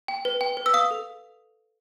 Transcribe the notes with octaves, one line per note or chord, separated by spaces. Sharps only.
G5
B4
G5
B4
E6
F5 D#6
A4